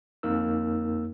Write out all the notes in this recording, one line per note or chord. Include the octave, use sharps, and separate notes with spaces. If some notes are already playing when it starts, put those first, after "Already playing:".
F2 A#3 D#4 A#4 E6